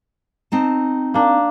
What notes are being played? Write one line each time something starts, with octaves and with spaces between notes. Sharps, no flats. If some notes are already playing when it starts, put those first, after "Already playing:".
C4 D#4 A5
A#3 D4